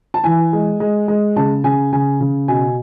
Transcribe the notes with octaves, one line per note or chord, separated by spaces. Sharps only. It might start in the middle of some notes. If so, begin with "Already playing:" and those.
A5
E3 G#5
G#3
G#3
G#3
C#3 A5
C#3 G#5
C#3 G#5
C#3
B2 G#5